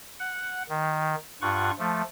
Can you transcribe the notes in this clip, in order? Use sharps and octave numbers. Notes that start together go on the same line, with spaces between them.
F#5
D#3
G2 F4 F#5 C#6
F3 A3